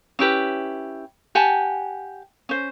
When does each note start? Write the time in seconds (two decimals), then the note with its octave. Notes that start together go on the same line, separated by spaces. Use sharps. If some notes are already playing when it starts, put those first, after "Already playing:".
0.19 C#4 E4 G4 B4
1.35 G4 F#5 G#5 A5
2.49 C#4 C5